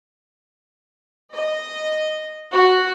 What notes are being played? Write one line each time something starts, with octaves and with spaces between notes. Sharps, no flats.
D#5
F#4